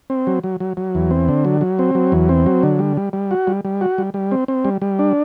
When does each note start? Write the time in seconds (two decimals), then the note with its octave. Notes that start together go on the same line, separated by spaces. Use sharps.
0.10 C4
0.27 F#3
0.44 F#3
0.60 F#3
0.77 F#3
0.95 E2
1.11 C4
1.29 D3
1.45 F#3
1.61 F#3
1.79 C4
1.95 F#3
2.12 E2
2.29 C4
2.46 F#3
2.63 D3
2.79 G3
2.97 G3
3.13 G3
3.31 F#4
3.47 G3
3.65 G3
3.81 F#4
3.98 G3
4.14 G3
4.31 C4
4.48 C4
4.65 G3
4.82 G3
4.99 D4